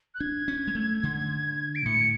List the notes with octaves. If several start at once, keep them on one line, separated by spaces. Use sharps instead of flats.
F#6
D4 G#6
C#4
G#3
A3
D3
D7
A2 C#7